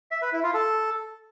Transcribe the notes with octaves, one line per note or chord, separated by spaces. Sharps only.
E5
B4
E4
F4
A4